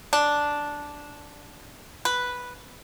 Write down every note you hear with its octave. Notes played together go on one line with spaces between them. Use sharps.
D4
B4